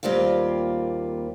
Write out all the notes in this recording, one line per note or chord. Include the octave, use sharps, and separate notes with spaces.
D#2 G3 A#3 C4 F4